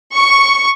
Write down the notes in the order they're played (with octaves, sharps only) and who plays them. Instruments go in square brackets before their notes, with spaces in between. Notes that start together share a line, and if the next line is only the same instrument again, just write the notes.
[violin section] C#6